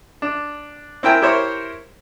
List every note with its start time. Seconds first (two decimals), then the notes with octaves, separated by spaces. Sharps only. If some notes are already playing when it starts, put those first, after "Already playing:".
0.22 D4
1.03 C4 E4 A#4 G5 G#5
1.22 E4 G4 A#4 C5 C#5